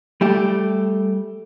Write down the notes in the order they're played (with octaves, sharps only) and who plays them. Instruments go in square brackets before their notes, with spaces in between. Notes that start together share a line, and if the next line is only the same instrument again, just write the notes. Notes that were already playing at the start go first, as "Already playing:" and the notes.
[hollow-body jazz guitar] G3 A3 G4